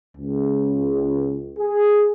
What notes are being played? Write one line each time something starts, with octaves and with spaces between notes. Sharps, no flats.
C#2
G#4